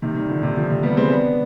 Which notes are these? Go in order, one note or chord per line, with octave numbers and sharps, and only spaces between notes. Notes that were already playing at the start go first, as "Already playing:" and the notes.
C3 D#3
D#3 G3
D3 F3
C3 D#3
D3 F3
C3
G3 B3
G#3 C4
B3 D4